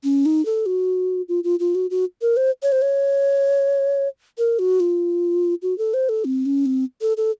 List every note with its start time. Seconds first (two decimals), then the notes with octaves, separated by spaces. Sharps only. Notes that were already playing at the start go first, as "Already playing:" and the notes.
0.04 C#4
0.26 D#4
0.46 A4
0.66 F#4
1.28 F4
1.44 F4
1.60 F4
1.75 F#4
1.90 F#4
2.22 A#4
2.37 C5
2.63 C#5
2.72 C5
2.82 C#5
4.38 A#4
4.59 F#4
4.80 F4
5.62 F#4
5.78 A4
5.94 C5
6.09 A4
6.25 C4
6.46 C#4
6.66 C4
7.02 A4
7.17 A4